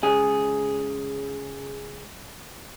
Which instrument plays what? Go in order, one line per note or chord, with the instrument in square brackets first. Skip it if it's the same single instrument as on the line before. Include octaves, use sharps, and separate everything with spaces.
[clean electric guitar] C#2 G#4